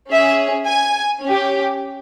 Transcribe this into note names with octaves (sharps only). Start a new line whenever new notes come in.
C#4 G#4 E5
G#5
C#4
G4